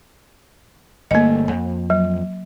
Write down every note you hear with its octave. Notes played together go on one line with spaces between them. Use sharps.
G1 A3 A#3 D#5
F2
F#3